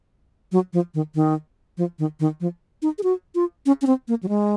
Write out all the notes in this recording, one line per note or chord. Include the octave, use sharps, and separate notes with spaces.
F#3
F3
D#3
D#3
F3
D#3
D#3
F3
D#4
G#4
F#4
F4
C#4
C#4
C4
A#3
F#3
G#3